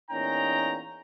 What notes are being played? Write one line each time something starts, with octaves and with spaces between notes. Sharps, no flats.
E2 A#2 C#4 D#4 G5 A#5